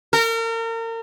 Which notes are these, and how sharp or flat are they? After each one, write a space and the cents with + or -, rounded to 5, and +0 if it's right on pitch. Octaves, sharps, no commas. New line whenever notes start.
A#4 -35